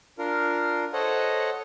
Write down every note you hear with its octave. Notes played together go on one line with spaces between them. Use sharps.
D4 F4 A#4
A4 C5 C#5 D#5 F#5